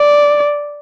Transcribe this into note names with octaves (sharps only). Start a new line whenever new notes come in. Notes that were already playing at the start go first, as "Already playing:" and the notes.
Already playing: D5